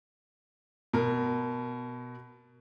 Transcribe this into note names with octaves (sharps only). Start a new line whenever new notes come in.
B2 A#4